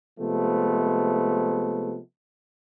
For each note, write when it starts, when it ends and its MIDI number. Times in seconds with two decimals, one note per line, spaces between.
0.20 1.98 48
0.20 1.98 53
0.20 1.98 56
0.20 1.98 57
0.20 1.98 59